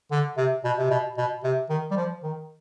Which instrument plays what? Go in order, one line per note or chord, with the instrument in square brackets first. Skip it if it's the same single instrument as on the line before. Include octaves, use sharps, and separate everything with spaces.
[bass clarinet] D3
C3
B2
C3
B2
B2
C3
D#3
G3
F3
D#3